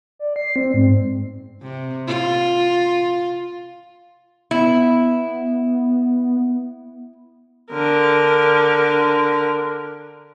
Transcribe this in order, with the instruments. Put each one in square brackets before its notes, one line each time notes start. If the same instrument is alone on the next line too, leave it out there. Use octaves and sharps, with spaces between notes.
[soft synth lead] D5
C7
C4
G#2
[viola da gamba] C3
F4
[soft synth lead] B3 [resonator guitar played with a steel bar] E4
[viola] D3 A#4